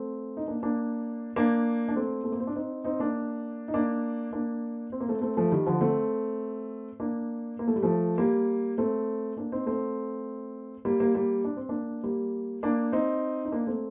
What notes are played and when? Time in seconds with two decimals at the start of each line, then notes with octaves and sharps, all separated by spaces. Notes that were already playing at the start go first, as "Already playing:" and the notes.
Already playing: A3 C4
0.37 D#4
0.48 A#3 D4
0.63 A#3 D4
1.36 A#3 D4
1.89 D4
1.96 A3 C4
2.24 A3
2.32 A#3
2.40 C4
2.47 D4
2.56 C4 D#4
2.84 C4 D#4
2.99 A#3 D4
3.68 D#4
3.74 A#3 D4
4.33 A#3 D4
4.92 C4
5.00 A#3
5.09 A3 C4
5.22 A3 C4
5.37 F3 A3
5.52 D#3 G3
5.66 D3 F3
5.81 A3 C4
7.00 A#3 D4
7.59 A#3
7.68 A3
7.76 G3
7.83 F3 A3
8.18 G3 A#3
8.78 A3 C4
9.37 A#3 D4
9.52 C4 D#4
9.66 A3 C4
10.85 G3 A#3
11.00 G3 A#3
11.15 G3 A#3
11.45 D4
11.57 C4
11.69 A#3 D4
12.03 G3 A#3
12.63 A#3 D4
12.92 C4 D#4
13.45 D#4
13.52 A#3 D4
13.67 A3 C4